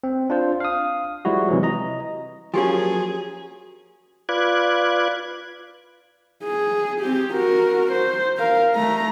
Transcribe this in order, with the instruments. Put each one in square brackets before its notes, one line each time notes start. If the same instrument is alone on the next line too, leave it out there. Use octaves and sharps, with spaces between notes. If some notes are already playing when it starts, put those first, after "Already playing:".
[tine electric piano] C4
D4 F4 C5
F5 D#6
F3 G3 G#3 E4 F#4
C3 E3 F#3
D#5 A#5
[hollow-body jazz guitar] F3 A#3 C#4 [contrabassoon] F#3 [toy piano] G4 G#5 [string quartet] G#4
[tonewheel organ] F4 B4 D5 F#6 G#6
[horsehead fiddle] G#4
C4 G4
F#4 A#4
C5
A#4 F5
A3 A#5